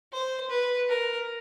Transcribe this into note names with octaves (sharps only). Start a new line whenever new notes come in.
C5
B4
A#4